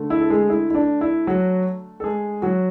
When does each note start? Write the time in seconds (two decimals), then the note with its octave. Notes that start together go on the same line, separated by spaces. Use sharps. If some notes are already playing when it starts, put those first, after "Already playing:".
Already playing: D3 A3
0.10 E4
0.21 A4
0.30 G#3 G#4
0.49 E4
0.70 E4
0.75 D4
1.01 E4
1.27 F#3 F#4
2.00 A4
2.04 G#3 G#4
2.42 F#3 F#4